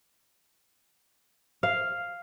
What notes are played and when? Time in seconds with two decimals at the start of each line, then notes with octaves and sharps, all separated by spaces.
1.63 F5